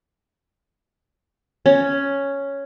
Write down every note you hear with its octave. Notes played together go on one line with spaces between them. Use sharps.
C#4